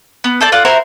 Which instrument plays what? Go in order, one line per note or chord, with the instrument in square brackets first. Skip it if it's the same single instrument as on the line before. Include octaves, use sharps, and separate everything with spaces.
[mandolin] B3
A4 C5 D5
F4 D5 F#5
E4 F#4 A#4 C5